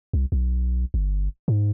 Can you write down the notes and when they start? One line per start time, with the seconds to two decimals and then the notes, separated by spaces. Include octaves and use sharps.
0.13 C2
0.32 B1
0.94 G1
1.48 G#2